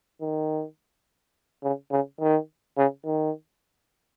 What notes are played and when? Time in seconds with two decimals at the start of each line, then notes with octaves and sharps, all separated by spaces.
0.21 D#3
1.63 C#3
1.91 C#3
2.20 D#3
2.77 C#3
3.05 D#3